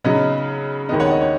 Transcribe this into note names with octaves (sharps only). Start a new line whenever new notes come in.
C#3 F#3 B3 D#4 D#5
D#2 D#3 G#3 B3 D#5
C#5 F#5
D#5
C#5